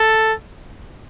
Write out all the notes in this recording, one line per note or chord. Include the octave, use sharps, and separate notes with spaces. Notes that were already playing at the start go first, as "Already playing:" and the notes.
Already playing: A4